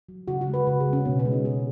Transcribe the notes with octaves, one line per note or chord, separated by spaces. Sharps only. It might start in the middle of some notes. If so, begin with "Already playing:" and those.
F#3
C#3 F#4
F#4
G#3
B4
C#3 B4
G#4
G#3
C#4
B2 B3
C#4
G#3
D#4
B2 G#4